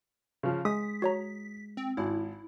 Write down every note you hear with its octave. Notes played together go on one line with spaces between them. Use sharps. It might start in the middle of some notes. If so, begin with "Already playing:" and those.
C#3 F3
G#3 D#6 B6
F#4 C#5 A#5
C4
G#1 E4